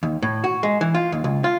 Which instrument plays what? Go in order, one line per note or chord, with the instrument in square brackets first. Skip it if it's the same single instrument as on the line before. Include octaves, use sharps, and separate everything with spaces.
[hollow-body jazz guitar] D#2
A2
F#4
G#3
E3
F4
D#2
C#2
F4